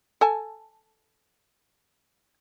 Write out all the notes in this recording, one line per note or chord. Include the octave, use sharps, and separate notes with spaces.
A4 G#5 A5